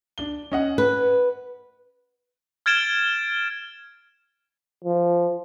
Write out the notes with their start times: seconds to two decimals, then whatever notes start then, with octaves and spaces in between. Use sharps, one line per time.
0.18 D4 G7
0.52 C#4 D#5 F#5
0.78 B4
2.66 F6 G#6 A6 D7 E7 G7
4.84 F3